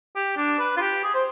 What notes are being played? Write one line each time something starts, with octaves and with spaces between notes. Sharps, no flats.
G4
D4
B4
F4
G4
G#4
C5